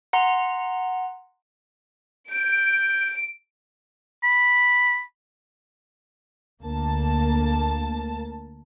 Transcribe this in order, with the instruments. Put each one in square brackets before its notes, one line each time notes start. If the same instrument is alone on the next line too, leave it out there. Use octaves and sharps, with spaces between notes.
[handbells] F#5 A#5 C6
[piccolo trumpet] G6 [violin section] D7
[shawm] B5
[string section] D2 A#3 A5